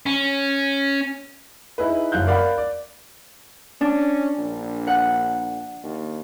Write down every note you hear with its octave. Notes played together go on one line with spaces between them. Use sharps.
C#4
D#4 E4 G#4 B4
F#1 F#2 F5 F#6 G6
A#4 D5 F5 F#5 B5
D5
C#4 D4
A#1
F#5 F#6
D#2